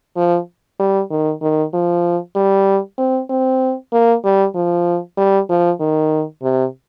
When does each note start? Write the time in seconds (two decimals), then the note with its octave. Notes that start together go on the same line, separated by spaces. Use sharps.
0.16 F3
0.79 G3
1.11 D#3
1.42 D#3
1.74 F3
2.35 G3
2.98 C4
3.30 C4
3.93 A#3
4.24 G3
4.55 F3
5.17 G3
5.49 F3
5.80 D#3
6.43 C3